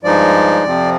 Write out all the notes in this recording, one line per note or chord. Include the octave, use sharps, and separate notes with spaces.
G2 F3 G#3 D#4 D5
F2 C3 F3 C4